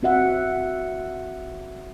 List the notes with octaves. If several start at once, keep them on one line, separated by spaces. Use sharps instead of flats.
C4 F#4 E5 F#5